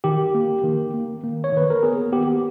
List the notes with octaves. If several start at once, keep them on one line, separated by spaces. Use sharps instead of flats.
D#3 G4
A#3
D#3
A#3
A#3
C#5
D#3 B4
A#4
B3 G#4
B3 G4